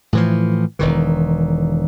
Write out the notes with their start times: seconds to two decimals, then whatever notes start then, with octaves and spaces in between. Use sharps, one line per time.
0.13 A2 E3 F3
0.79 E1 D#3 E3